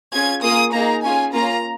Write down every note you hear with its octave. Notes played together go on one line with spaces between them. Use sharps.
C#4 F4 G#4 G#6
A#3 F4 G#4 D#6
A#3 D#4 G#4 A#5
C#4 F4 G#4 G#5
A#3 C#4 F4 A#5